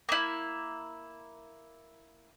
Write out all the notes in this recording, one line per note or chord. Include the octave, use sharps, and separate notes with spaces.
A#3 E4